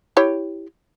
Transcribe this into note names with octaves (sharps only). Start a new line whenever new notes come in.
E4 G4 C#5